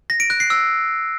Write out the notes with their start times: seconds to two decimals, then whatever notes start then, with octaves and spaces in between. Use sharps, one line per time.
0.10 A#6
0.20 D7
0.30 F#6
0.40 C7
0.50 E6